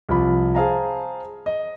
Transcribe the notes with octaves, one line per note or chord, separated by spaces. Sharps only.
C2 F3 B5
G#4 C5 F5 A5 A#5
D#5